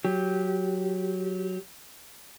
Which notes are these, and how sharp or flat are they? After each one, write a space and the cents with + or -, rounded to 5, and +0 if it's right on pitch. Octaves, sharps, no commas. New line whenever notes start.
F#3 +0 G4 +0